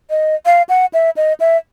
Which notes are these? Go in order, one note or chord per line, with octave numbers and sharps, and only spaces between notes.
D#5
F5
F#5
E5
D#5
E5